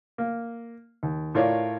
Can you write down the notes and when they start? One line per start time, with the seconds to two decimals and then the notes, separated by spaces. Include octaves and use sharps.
0.18 A#3
1.03 D#2
1.35 A2 F4 A#4 C#5 D5